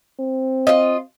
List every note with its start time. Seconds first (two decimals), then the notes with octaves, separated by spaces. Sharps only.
0.19 C4
0.67 F4 D#5